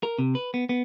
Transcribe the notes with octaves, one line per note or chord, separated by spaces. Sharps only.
A#4
C3
B4
B3
B3